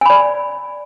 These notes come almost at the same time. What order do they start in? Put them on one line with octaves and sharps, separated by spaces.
G#5 B5 D5